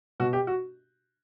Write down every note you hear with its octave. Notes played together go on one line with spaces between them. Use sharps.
B2 F#4
G4
F#4